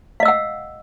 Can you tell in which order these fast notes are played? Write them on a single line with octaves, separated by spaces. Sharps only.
F5 D#5 E6 F#5